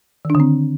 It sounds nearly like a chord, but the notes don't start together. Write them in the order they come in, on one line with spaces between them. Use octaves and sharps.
D#3 D4 D3 C4